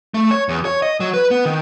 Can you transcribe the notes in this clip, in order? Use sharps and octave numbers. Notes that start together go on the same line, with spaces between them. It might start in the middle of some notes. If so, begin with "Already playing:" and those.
A3
C#5
E2
C#5
D#5
F#3
B4
B3
D#3